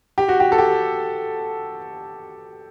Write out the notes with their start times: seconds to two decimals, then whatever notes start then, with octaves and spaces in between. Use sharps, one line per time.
0.18 G4
0.28 F#4
0.40 G4
0.52 A4
0.58 G4